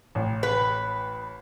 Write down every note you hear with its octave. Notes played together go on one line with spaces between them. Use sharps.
A1
B4